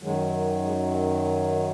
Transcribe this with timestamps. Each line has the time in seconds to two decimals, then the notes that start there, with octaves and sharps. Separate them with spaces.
0.02 F#2 D#3 F#3 G#3
0.63 G#3